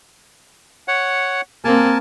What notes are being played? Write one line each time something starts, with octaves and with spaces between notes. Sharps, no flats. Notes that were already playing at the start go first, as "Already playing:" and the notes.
C#5 F#5
A#3 C4 A#4 G#5 A5